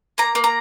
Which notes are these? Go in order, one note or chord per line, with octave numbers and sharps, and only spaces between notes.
A#3 A#5
A#3
A#5